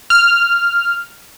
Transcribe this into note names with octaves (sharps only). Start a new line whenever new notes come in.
F6